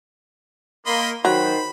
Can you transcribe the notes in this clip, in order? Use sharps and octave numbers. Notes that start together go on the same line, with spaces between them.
A#3 D#5 B5 C6
D#3 F#3 C5 B5